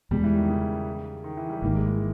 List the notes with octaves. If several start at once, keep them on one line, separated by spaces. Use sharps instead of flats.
E2 B2 G3 G#3
E3
D#3
C#3
D#3
E3
G3
G#1 G#2 D#3 A#3
G#3
E3